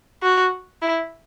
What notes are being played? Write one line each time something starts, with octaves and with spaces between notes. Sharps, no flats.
F#4
E4